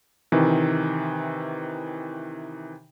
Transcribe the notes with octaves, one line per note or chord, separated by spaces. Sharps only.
C3 D#3 E3